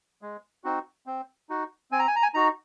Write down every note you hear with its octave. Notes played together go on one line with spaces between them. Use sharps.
G#3
C4 D#4 F#4
C4
D#4 F#4
C4 G#5
A#5
G#5
A#5
G#5
D#4 F#4 A#5